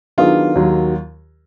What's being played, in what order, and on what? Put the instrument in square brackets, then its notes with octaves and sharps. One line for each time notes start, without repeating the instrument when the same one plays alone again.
[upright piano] D#3 F#3 B3 D4 G#4 [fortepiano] F4
[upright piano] D#2 D#3 F#3